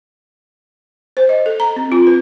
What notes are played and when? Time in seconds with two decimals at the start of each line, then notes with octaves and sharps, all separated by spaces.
1.17 C5
1.29 D#5
1.46 A4
1.60 A#5
1.76 C4
1.92 F4
2.07 B4